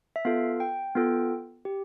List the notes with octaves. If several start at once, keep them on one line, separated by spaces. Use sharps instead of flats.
E5
B3 F4 A4 F5
G5
B3 F4 A4
G4